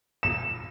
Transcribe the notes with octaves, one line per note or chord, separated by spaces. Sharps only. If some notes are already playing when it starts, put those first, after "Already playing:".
E7